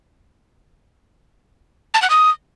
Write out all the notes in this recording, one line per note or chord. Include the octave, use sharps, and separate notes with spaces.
A5
F#5
D#6